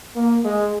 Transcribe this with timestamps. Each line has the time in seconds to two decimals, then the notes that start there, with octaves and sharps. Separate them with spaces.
0.16 A#3
0.45 G#3